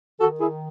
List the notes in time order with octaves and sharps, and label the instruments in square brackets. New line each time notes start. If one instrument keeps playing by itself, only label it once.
[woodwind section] D#3 F#4 A4
E4 G#4